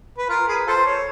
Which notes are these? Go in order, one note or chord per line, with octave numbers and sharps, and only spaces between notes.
B4
F4 A#4
G#4 B4
F4 A4 C5
C#5